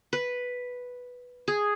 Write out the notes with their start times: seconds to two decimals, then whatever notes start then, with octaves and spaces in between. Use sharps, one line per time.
0.13 B4
1.48 G#4